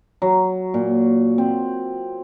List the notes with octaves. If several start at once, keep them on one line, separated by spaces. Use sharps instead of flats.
F#3
A#2
C4